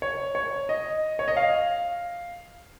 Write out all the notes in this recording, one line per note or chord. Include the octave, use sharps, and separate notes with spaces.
C#5
C#5
D#5
C#5
D#5
F5